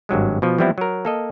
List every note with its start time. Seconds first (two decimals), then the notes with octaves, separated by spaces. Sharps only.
0.09 G#1 G2 F#3 G#3
0.42 B2 F3
0.59 E3 F3 G3 B3 C4 E4
0.78 F#3 A#4
1.05 A#3 A4 D#5